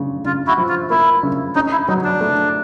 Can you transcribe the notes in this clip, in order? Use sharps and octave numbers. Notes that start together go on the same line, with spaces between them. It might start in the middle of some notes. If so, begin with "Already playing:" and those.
Already playing: C#3
C#3 F4
E4 F#4
F3
F4
A#3 E4
C#3
C#4 D#4
E4
F#3 D#4
D4
A3